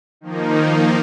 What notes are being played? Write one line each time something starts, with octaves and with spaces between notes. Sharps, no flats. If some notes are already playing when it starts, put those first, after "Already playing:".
D#3 F3 A#3 D#4